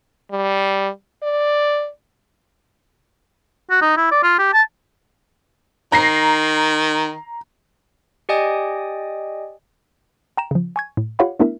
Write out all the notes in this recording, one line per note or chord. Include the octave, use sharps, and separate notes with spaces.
G3
D5
F#4
D#4
E4
D5
F4
G4
A5
D#3 A#5 A#6 C7
G4 D5 D#5 G5 G#5 D#6
G5 A#5 E7
C#3 F3
G#5 C#6 G#6
A2
F4 G4 C#5 F5 F#5 B5
A3 B3 D4 E4 A#4 E5